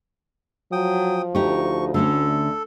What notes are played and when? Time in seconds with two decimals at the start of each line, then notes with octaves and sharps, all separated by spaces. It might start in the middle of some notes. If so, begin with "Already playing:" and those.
0.72 F3 F#3 G5 D#6
1.35 D2 D#4 G4 C#6
1.94 D3 A3 C#4 A4